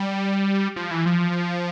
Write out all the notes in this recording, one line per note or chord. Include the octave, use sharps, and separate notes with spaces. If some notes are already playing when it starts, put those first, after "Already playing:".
Already playing: G3
F3
E3
F3